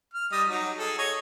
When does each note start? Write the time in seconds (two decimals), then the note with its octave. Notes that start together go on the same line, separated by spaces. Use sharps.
0.14 F6
0.32 G3 D#5 D#6
0.48 F#3 D#4
0.78 G#4 A4
0.98 C#5 D#5